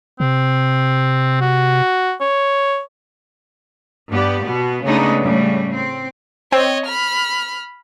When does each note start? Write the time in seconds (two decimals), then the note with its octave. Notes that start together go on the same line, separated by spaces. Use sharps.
0.20 C3 C4
1.41 F#4
2.21 C#5
4.10 G2 B3 G4 D5
4.43 B2 B3
4.85 C#3 G#3 A3 B3 D4 D#4
5.22 A2 C#3 G3
5.74 C4
6.52 C4 C#5 D#5
6.86 B5 F6